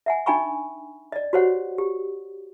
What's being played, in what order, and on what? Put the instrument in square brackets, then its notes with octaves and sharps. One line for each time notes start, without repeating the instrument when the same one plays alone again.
[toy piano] E5 F#5 G#5
D4 D#4 G5 G#5 B5 C#6
D5 D#5
F#4 G4 C5 C#5 F#5
G4